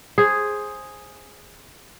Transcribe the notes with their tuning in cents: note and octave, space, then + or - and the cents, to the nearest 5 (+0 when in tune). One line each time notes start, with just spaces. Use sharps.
G#4 +0 C5 +15